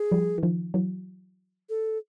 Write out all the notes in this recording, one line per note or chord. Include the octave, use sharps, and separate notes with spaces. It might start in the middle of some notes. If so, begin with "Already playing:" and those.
Already playing: G#4
F3 G3
E3
D#3 F3
E3 F#3
A4